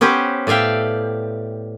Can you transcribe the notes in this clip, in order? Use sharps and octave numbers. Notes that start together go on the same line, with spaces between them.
B3 C#4 G4 B4 C5
A2 D5 E5 F5 G5